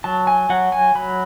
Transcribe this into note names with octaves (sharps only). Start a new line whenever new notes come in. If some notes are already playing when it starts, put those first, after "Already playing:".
F#3 A5
G#5
F#3 F#5
G#5
F#3 B5